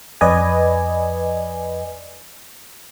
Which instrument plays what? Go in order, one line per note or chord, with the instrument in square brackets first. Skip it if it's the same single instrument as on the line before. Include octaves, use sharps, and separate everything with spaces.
[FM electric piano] F2 B4 D5 D#5 G#5